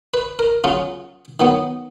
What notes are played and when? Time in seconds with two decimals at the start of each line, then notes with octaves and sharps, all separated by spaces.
0.14 B4
0.39 A#4
0.64 C#3 F#3 C#4 F4
1.40 D#3 F#3 B3